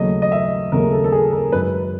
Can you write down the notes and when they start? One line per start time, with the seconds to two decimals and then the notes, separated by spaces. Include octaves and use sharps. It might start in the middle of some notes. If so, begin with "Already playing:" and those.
Already playing: D#2 C#3 F#3 A3 D#5
0.22 D#5
0.32 E5
0.72 D#2 C#3 F#3 A3 A#4
0.92 A4
1.04 A4
1.12 G#4
1.33 A#4
1.52 F#2 D#3 G#3 B4